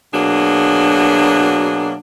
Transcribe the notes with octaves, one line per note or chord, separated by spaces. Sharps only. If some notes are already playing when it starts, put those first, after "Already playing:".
B2 F#3 A#3 D4 G#4